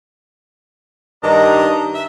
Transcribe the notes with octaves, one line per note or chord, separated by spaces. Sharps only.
G2 D#3 D4 D#5 A#5
E5